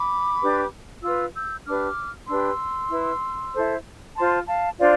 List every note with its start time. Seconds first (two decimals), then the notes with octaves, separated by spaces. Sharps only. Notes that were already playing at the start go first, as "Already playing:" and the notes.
Already playing: B5 D6
0.41 D4 G4 B4
1.03 F4 B4 C6 E6
1.34 E6 G6
1.66 D4 G4 B4 D6 F6
2.28 D4 G4 B4 C6 E6
2.90 E4 B4
3.54 E4 A4 C5
4.16 F4 C5 A5 C6
4.47 F5 A5
4.79 D4 F4 C5 D5 F5